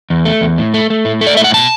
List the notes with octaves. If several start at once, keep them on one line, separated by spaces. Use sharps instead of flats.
E2
A3
E2
A2
A3
A3
A2
A3
D5
A2 E5
F#5
B2 A5